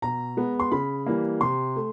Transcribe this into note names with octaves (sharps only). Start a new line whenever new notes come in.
B2 A#5
G#3 B3
C6
C#3 B5
E3 G3 A#3
C3 C6
A3